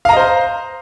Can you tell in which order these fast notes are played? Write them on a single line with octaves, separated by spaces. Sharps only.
F5 A#5 D#5 C5